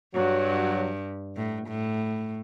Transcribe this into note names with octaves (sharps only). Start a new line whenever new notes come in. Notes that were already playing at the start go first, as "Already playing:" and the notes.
G2 F#3
A2
A2